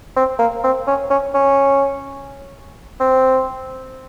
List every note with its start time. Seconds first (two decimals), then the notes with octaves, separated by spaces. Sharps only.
0.17 C4
0.39 A#3
0.64 C4
0.87 C#4
1.10 C#4
1.34 C#4
3.00 C4